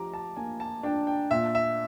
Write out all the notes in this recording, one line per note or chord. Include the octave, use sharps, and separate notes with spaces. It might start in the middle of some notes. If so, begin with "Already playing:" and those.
Already playing: F3 G4 A#5 D6
A5
A#3 G#5
A5
D4 G5
G5
A#2 E5
E5